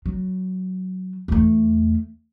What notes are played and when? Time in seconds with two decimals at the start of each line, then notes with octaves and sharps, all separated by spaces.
0.06 F#3
1.28 E2 A3